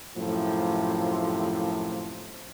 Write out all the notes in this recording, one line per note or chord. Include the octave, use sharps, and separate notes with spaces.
F#2 A2 C3 F3